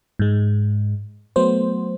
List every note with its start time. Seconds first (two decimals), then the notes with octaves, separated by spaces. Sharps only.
0.19 G#2 G#3
1.36 F#3 A3 B3 C5